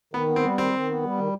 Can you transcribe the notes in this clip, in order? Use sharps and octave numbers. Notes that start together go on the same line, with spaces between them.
D#3 B3
B3
C4
G3
D#3 C4
D#3
B3
G3
D#3